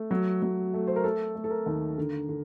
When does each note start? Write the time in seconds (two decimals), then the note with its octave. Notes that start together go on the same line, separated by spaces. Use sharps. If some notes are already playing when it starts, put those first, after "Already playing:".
Already playing: A3
0.10 F#3 F#4
0.42 F#3
0.74 A3
0.87 C5
0.96 A#4
1.04 A3 A4
1.35 A3
1.44 A4
1.50 A#4
1.66 D#2
1.98 D3
2.29 D3